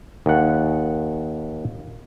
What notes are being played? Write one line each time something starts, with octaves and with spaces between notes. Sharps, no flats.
D#2 F#5